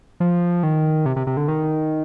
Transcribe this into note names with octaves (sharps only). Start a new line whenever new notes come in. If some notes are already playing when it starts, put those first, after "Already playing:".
F3
D#3
C3
C3
C3
D3
D#3